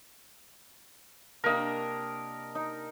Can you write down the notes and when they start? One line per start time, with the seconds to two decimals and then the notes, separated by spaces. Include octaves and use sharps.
1.44 C3 A#3 D4 A#4 D#5
2.55 D#4